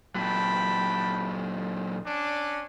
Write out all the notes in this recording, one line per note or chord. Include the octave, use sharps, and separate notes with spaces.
A#2 F#3 G5 A5 B5
C#4 D4 D6